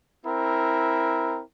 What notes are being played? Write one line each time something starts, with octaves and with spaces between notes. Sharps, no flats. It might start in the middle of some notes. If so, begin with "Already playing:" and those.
C4 E4 A#4